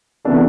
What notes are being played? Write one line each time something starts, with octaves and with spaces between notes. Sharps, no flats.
C3 E3 B3 D4 A4